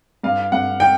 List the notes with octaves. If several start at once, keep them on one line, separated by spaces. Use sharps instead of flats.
G2 F5
G2 F#5
G5